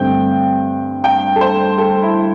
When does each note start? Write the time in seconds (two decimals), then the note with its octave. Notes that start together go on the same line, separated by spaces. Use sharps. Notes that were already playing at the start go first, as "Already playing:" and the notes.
Already playing: G2 D3 A3 C4 G5
1.04 G5
1.36 A4
1.41 C5
1.78 A4
2.02 E4